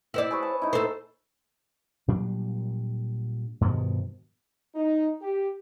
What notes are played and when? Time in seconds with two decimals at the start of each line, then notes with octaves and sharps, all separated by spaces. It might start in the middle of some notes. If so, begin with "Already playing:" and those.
0.14 E4 C5 D5
0.31 G#4 B4 C#5
0.43 A5
0.62 D#4 E4
0.73 A4 C5
2.08 A#2 F#3 G3 D4
3.61 G2 B2 D#3 F3
4.75 D#4
5.22 G4